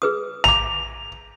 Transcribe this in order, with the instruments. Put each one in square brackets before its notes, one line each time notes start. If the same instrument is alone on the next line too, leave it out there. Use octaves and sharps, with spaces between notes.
[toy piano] G#4 B4 D#6
[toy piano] A#5 D6 [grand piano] F7